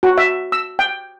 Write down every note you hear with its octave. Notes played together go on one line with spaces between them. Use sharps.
F#4
E5
E6
G5